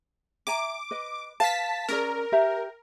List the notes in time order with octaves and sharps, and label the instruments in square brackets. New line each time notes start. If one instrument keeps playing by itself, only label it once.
[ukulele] E5 G#5 A#5 [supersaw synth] D6
[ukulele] B4 D#5
[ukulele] B4 F5 [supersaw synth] A5 B6
[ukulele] C#4 G#4 D5 [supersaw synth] A#4
[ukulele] G4 E5 A#5